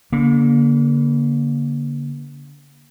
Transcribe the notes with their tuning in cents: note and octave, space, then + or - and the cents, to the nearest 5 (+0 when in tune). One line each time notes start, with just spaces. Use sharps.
D3 -35 A#3 +15